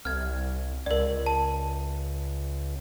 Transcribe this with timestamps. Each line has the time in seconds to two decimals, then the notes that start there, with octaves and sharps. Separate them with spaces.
0.05 C2 F6 G#6
0.86 C#2 A#4 D5
1.26 A5